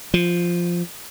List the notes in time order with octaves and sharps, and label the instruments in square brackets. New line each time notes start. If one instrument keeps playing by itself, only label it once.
[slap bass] F3